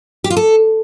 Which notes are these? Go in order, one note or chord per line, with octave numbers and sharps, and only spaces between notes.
G4
F4
A4